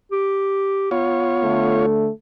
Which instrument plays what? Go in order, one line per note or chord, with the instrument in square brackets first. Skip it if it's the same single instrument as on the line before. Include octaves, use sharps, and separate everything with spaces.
[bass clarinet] G4
[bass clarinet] B3 [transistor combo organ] F4 C#5
[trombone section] D3 A3